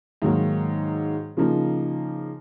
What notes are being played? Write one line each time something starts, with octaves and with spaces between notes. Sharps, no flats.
G#2 D#3 F#3 A#3
C#3 F3 A#3 D#4